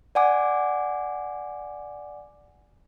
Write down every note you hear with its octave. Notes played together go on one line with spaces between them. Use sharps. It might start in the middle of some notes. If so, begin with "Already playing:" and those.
D5 F#5 G#5 D6